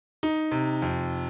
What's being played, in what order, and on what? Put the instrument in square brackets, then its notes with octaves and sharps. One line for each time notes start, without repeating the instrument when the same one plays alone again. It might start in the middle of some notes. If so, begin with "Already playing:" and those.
[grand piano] D#4
C3
F2